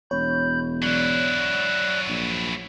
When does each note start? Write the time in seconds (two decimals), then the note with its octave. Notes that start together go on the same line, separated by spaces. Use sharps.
0.11 E1 C#5 B5 G6
0.82 F#3 E4 D5 F#6
2.08 A#1